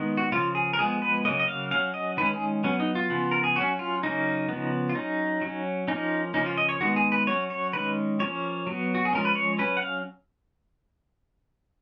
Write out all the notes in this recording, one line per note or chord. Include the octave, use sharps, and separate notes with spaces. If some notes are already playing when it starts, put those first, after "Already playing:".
Already playing: D#3 G#3 B3
F#4
C#3 F3 A#3 F4
G#4
A#4
F3 G#3 B3 G#4
B4
C#3 F#3 A#3 D#5
D#5
F5
F#3 C#4 F5
D#5
D#3 G#3 C#4 B4
G#4
F#3 B3 C#4
D#4
F4
C#3 F3 B3
A#4
G#4
F#3 C#4 F#4
F4
C#3 F#3 A#3 C#4 D#4
C#3 F3 B3
F4
F#3 C#4 D#4
F#3 C#4
F3 A#3 C#4 D#4
C#3 F3 A#3 C#4 D#4
F4
D#5
C#5
D#3 G#3 B3 F#4
G#4
B4
F#3 C#4 C#5
C#5
D#3 G#3 C#4 B4
F3 A#3 C#4 C#5
F#3 B3
F#4
G#4
F3 G#3 C#4 A#4
B4
C#5
F#3 C#4 B4
F#5
F5